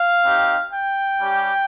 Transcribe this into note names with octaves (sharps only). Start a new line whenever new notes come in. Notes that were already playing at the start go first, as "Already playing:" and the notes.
Already playing: F5
C4 D#4 G4
G5
G3 C#4 G4